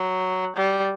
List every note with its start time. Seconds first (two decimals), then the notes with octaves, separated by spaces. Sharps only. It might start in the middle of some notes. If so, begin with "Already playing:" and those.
Already playing: F#3
0.56 G3